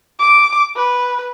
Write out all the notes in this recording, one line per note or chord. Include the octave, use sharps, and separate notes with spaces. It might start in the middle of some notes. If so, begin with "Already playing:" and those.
D6
B4